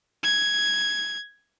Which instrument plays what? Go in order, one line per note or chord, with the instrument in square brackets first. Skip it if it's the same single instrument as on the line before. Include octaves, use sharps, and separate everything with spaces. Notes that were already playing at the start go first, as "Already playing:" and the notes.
[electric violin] G#6